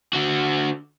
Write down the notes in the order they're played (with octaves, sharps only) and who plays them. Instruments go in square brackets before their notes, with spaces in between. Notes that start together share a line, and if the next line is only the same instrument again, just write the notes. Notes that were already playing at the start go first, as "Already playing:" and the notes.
[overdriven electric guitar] D3 F#4